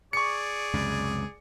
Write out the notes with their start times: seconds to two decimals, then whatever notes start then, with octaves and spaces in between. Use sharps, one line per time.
0.13 G#4 D5 C#6 C#7
0.74 C#2 F#2 C3